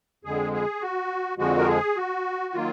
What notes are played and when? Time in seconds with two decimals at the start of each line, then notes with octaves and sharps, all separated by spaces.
0.24 F2 D3 G#3 G#4
0.53 G#4
0.81 F#4
1.38 F2 D3 F3 G#3 F#4
1.58 A#4
1.68 G#4
1.97 F#4
2.54 D#3 F#3 A#3 F4